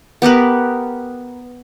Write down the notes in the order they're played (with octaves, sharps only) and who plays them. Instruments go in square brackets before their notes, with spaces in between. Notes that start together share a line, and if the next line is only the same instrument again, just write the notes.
[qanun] B3 G4 A#4 B4